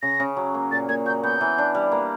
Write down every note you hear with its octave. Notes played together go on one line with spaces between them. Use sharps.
C#3 A#6
C#3
F#3
A#3
A#2 A6
A#2 G#6
F#3 G6
B3 G6
E3
D4
G3
A#3